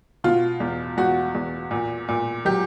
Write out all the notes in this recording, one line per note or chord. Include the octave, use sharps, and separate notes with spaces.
B2 F4
E2
E2 F#4
E2
A#2
A#2
F#3 G4